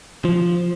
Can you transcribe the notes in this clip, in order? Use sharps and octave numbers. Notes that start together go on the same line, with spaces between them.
F3